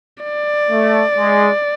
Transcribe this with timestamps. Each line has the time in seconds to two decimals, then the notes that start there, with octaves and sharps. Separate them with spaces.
0.23 D5
0.70 A3
1.16 G#3